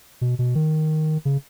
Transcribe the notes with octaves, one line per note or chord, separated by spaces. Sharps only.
B2
B2
D#3
C#3